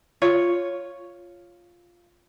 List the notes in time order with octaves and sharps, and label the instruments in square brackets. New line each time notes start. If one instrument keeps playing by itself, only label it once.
[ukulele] F4 C#5